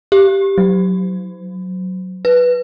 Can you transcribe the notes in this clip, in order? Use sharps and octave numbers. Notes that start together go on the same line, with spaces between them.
G4
F#3
B4